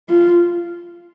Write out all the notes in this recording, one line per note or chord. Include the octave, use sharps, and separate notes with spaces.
F4